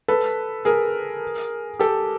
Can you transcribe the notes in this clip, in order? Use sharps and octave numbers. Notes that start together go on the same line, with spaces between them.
A4 B4
G#4 A#4
G4 A4